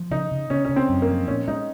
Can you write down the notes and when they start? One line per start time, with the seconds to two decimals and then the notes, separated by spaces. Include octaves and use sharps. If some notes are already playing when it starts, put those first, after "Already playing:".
Already playing: F3
0.11 C#3 D#4
0.31 C#3
0.50 C#3 C#4
0.65 C#3 C#4
0.76 C4
0.89 F#2
1.02 A#3
1.09 F3
1.28 A#2 C#4
1.48 G#3 D#4